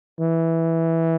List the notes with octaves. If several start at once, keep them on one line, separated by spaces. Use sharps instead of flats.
E3